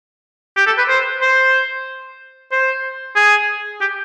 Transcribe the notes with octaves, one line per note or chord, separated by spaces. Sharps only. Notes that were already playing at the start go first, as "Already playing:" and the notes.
G4
A4
B4
C5
C5
C5
G#4
G4